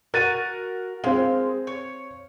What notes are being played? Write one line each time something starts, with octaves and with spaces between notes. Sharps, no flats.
F#4 A#4 F#5 A6 D#7
G#3 C4 F5
C#5